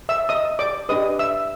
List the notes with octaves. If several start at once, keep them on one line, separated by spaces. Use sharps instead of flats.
E5 E6
D#5 D#6
D5 D6
D4 G4 B4 D#5 D#6
E5 E6